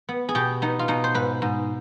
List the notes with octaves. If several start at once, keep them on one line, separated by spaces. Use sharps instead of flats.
B3
G#4
B2 G4
B3 D#4
F4
B2 D#4
C5
G#2 B4
G#2